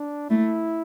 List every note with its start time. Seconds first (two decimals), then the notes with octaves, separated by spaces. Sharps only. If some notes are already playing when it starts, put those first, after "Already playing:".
Already playing: D4
0.30 A3 E4